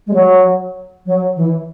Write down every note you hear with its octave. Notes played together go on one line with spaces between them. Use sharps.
G#3
F#3
F#3
E3